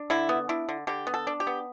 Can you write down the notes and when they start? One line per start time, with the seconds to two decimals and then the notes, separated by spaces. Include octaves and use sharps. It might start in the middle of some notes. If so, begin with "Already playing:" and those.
Already playing: D4
0.10 D3 E4
0.29 B3
0.49 D4 E4
0.69 D3
0.87 D3 G4
1.07 B3
1.14 A4
1.27 D4
1.40 G4
1.47 B3